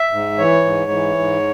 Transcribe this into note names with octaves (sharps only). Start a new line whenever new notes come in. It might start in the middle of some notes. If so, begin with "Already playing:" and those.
Already playing: E5
G#2
E3 C#5
G#2
E3
G#2